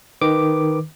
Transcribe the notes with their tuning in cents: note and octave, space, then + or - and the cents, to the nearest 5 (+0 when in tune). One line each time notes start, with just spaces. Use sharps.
D#3 +0 B4 +0 D6 +0